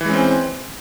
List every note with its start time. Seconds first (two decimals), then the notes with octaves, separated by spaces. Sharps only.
0.01 E3
0.05 G#3
0.09 C#4
0.14 C4